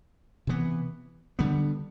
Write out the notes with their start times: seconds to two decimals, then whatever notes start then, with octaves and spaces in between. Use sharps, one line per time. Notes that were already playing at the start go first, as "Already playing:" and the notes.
0.47 C3 E3 B3
1.39 D3 G3 B3